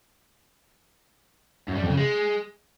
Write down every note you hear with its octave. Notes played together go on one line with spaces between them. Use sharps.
F#2
G3
F2
C#3
G#3